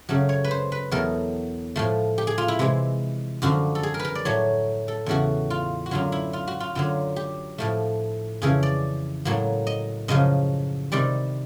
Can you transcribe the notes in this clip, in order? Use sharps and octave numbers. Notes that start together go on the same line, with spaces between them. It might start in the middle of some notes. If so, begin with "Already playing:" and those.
F#2 C#3 F#3 A3
C#5
B4
C5
B4
E2 B2 F#3 A3 A#4
A2 F3 A3
G4
G#4
F4
E4
C3 E3 G#3
F#2 D3 F3 F#4
A4
G#4
A#4
B4
A#4
D5
A2 F#3 A3 C#5
A4
E2 C#3 E3 A3 F#4
F4
F#4
F#2 D3 F#3 F4
E4
F4
F#4
F4
F#2 D3 F#3 F4
G4
A2 F3 A3
F2 C#3 E3 G#4
D5
A2 F#3 A#3
D#5
F#2 C#3 F3 D#5
C3 D#3 G3 D5